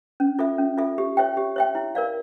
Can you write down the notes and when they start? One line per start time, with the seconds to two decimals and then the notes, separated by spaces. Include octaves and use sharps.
0.20 C#4
0.39 F4 A4 E5
0.58 C#4
0.77 F4 A4 E5
0.98 G4
1.17 C#5 E5 G5
1.37 G4
1.56 C#5 E5 G5
1.75 E4
1.95 A#4 D5 F5